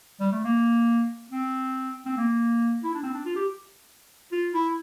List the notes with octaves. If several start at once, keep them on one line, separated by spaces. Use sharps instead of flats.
G3
A3
A#3
C4
C4
A#3
E4
D4
C4
D4
F4
G4
F4
E4